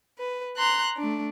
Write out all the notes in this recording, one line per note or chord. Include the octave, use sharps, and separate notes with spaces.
B4
A#5 C6 F#6
A3 D4